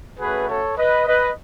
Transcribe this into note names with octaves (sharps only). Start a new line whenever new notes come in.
A3 C#4 F#4 G#4 B4
A4 C#5
B4 D#5
B4 D#5